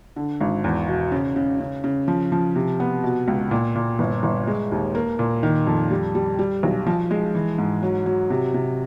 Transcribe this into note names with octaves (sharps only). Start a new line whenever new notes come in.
D3
G#1
E2
B2
C#3
C#3
C#3
C#3
F3
F3
C3
B3
B2
C#2
A#2
A#2
G1
G1
G#3
D#2
A#3
A#2
D#3
F2
G3
G3
G3
B1
F3
G#3
E3
G#2
F#3
F#3
C3
C3